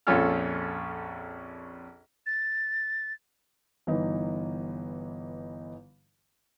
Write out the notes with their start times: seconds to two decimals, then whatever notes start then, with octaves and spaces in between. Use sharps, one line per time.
0.07 A#1 F2 C#4 F4 A4 F6
2.26 A6
3.87 G1 E3 D#4